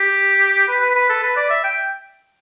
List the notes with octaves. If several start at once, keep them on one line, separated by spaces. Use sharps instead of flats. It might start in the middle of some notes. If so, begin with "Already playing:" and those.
Already playing: G4
B4
B4
B4
A4
B4
D5
E5
G5